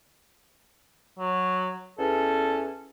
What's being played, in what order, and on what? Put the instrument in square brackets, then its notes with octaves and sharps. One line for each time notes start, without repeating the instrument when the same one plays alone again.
[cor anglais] F#3
[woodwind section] E2 C#4 [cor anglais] A4